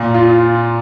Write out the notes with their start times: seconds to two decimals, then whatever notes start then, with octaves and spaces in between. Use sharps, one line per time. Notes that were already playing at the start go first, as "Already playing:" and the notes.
Already playing: A#2
0.14 F4